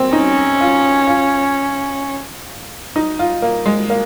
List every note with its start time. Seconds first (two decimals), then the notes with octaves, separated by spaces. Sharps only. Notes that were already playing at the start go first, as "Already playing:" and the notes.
Already playing: A#3 C4
0.13 C#4 D#4
0.61 F4
1.07 F4
2.96 D#4
3.19 F4
3.42 A#3
3.66 G#3
3.90 A#3